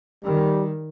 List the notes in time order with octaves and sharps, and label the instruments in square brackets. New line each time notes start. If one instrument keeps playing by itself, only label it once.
[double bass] D#3 [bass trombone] G3